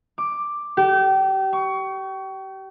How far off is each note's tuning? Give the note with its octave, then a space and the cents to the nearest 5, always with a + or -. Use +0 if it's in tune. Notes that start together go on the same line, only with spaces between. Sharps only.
D6 +5
G4 -30
C#6 +25